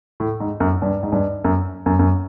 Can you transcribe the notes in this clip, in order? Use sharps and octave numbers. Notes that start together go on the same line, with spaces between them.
A2
G#2
F#2
G2
G#2
G2
F#2
F#2
F#2